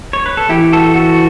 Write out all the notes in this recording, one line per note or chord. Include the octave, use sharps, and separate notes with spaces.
C#5
B4
A4
E3 E4 G4
F#4 A4
F#4 A4